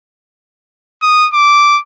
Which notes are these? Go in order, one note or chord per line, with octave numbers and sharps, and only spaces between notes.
D#6
D6